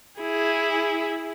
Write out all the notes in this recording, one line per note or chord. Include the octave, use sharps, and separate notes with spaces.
E4 G#4